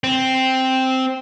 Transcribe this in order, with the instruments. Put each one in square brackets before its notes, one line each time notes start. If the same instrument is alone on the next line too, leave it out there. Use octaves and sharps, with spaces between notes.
[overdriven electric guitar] C4